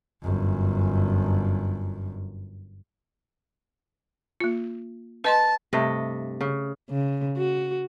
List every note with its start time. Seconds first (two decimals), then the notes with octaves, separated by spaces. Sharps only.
0.23 G1 F#2
4.40 A#3 F4
5.24 B4 D#5 A5 C6
5.73 G2 C3 A3 D#5
6.41 C#3
6.90 C#3
7.37 F#4